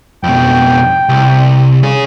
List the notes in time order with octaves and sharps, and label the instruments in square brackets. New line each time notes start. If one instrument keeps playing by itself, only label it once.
[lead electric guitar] F2 B2 [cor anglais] G5
[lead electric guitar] C2
C#4 G#4